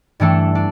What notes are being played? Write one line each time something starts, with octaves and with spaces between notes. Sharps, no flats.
G2 E3 A3 D4 A4
D4